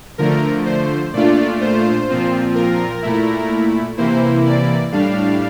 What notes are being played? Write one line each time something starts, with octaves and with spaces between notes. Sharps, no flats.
D3 F3 A3 A#4
C5
A#2 A3 D4 F4 D5
C5
A#2 F3 C4 F4
A#4
A#2 A3 E4
C3 E3 A#3 E4 C5
D5
A2 G3 D4 F5